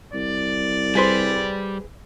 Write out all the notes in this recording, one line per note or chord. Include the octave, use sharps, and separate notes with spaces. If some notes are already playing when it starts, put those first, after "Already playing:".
C2 D5
G3 G#4 B4 C5